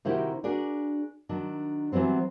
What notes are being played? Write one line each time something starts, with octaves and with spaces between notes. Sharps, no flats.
C3 D#3 E4 F#4 G4 A#4
D4 F#4 G#4 A#4 D5
D#3 F#3 D4
E3 F#3 G3 B3 C4